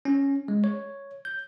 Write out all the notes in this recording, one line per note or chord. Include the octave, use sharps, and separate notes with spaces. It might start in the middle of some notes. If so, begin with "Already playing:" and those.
C#4
G#3
C#5
G6